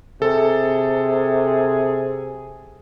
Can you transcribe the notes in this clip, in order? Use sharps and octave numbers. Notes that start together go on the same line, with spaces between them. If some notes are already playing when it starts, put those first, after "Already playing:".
C3 G#4 A4